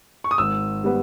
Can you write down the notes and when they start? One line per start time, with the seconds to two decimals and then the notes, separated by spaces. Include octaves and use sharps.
0.24 C#6
0.31 D#6
0.38 G#1 E6
0.84 G3 B3